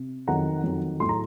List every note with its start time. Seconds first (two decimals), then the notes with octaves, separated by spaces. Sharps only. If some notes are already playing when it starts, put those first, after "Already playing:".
Already playing: C3
0.28 F2 D#3 F#3 F#5 A#5
0.64 F2 D#3 F#3
1.00 A2 F#3 C6
1.09 A#5